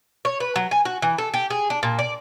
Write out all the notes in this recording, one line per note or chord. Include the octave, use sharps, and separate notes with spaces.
C#5
B4
F#3
G#5
F#4
E3
A4
G4
G#4
D4
A#2
D5